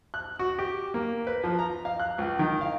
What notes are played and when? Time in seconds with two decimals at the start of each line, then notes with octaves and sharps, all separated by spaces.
0.14 F#6
0.39 F#4
0.59 G4
0.94 A#3
1.27 B4
1.44 F3
1.59 A#5
1.85 F5
1.99 F#6
2.18 C#2
2.39 D#3
2.61 F5